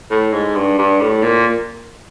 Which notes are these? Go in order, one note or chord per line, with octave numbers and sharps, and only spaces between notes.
A2
G#2
G2
G2
A2
A#2